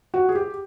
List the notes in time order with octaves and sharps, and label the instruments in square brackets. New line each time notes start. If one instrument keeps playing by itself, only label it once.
[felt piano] F#4
G#4
G4